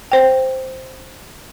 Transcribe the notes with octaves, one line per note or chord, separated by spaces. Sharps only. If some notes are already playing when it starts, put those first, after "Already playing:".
C5 G5